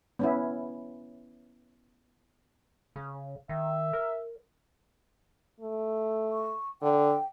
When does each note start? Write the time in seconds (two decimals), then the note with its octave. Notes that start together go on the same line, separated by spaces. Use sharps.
0.19 B3 C#4 E4
2.96 C#3
3.49 D#3 E5
3.93 A#4
5.61 A3
6.30 C#6
6.82 D3 G5